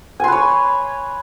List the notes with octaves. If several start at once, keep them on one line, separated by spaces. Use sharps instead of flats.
B4 C#5 G#5 C6